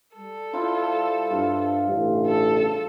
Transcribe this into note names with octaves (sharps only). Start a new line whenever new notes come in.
G3 A4
E4 F4 C5
G2 F4
A1 G2 C#3
A4